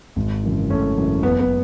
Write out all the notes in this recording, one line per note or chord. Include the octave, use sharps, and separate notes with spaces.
G#1
F#2 C#3 E3
G#1 A3 C#4
F#2 C#3 E3
F#1 B3
B3